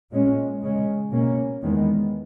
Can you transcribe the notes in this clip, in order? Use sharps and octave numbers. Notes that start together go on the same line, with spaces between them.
A#2 G#3 C#4
C#3 G#3 C#4
B2 A#3 C#4
E2 D#3 G#3 B3